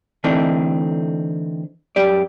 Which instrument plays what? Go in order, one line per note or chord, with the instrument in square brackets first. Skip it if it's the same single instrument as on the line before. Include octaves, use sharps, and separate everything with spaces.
[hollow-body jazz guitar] D3 E3 A3 C4 D4 D#4
F#2 G4 D5